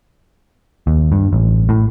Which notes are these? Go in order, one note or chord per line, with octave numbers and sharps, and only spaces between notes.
D#2
G2
A1
A2